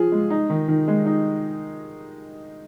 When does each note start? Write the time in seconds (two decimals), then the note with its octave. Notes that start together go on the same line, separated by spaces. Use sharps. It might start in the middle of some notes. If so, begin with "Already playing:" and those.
Already playing: F3 F4 G#4
0.12 G#3
0.30 D#4
0.50 D#3
0.68 D#3
0.88 G#3
1.06 D#4